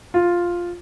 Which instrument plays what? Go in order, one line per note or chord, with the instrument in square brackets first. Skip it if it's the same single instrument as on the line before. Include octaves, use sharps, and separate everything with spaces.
[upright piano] F4